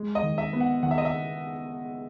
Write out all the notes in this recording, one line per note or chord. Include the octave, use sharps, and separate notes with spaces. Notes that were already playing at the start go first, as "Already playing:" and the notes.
Already playing: G#3
D#5
D#3
E5
B3
F#5
D#3 F#5
E5
D#5
E5